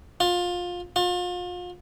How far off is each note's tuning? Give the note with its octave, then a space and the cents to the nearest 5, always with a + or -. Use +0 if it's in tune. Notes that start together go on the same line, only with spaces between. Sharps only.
F4 +20
F4 +35